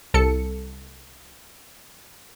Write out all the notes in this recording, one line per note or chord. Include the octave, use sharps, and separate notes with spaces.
C2 A4 C#7